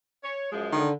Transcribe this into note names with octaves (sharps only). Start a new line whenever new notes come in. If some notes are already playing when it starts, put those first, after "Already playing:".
C#5
F#2 F3 G#3
D3 D#3